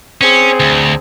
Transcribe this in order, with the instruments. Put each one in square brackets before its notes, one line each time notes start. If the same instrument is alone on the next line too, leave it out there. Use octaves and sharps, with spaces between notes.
[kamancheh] C4 G#4 [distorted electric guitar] C#4
[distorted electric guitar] D2